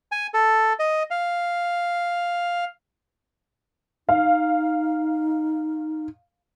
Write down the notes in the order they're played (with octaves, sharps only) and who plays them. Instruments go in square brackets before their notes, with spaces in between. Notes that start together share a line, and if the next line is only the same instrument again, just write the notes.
[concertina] G#5
A4
D#5
F5
[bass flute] D#4 [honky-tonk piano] F5